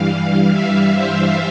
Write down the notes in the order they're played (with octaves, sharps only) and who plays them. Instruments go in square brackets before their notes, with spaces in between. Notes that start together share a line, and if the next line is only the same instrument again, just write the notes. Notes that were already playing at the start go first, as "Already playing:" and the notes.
Already playing: [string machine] G2 E3 G3 F5
E5
C5